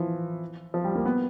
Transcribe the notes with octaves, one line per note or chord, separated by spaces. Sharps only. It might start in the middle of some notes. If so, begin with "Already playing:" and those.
Already playing: E3 F3
F3
G3
A#3
B3